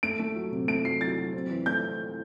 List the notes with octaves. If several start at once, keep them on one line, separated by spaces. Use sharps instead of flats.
A3 D7
A3
F#3
C3
A3 D7
F#3 C7
F#3 A6
F#3
C4
E3
A3 G6